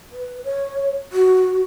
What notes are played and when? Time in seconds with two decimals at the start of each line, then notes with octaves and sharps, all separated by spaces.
0.12 B4
0.44 C#5
1.12 F#4